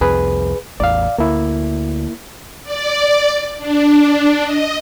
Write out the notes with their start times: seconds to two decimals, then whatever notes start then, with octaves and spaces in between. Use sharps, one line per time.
0.01 C2 F2 G#4 B4
0.80 A1 E2 D5 F5
1.18 D2 A#3 E4
2.63 D5
3.58 D4
4.42 D#5